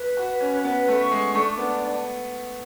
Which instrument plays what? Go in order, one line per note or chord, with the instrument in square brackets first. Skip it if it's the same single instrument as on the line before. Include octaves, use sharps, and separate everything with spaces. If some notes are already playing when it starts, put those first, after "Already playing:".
Already playing: [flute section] B4
[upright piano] F#4
[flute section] B4
[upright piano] C#4
C#4
[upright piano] B3 [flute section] B4
[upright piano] A3
[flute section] C#6
[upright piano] G#3
[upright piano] A3 [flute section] D4
[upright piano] B3